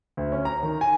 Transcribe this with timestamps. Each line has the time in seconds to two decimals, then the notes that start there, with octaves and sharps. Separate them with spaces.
0.17 D2
0.32 C#4
0.45 A#5
0.63 D#3
0.81 G#5